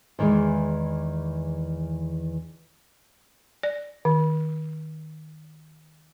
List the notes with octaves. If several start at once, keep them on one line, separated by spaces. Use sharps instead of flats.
E2 D#3 E3 G#3
D5
D#3